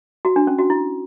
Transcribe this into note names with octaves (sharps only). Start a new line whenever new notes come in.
F#4
D4
C#4
F#4
E4